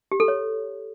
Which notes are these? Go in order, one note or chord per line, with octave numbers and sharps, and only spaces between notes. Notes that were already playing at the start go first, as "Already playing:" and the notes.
G4
A4
C#5